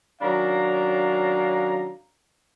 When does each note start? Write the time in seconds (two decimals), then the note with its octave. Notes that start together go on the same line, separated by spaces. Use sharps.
0.22 D#3 F#3 C#4 D4 F5 A#5